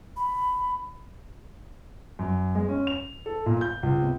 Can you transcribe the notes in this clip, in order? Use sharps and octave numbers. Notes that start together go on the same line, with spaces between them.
B5
F#2
G#3
C#4
F7
A4
A#2
G6
C#2
C3